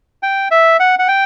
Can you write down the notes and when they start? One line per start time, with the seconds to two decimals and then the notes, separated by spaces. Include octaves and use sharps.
0.23 G5
0.51 E5
0.80 F#5
0.99 F#5
1.08 G5